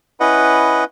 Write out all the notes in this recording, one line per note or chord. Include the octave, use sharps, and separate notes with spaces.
C#4 E4 B4 D#5 F#5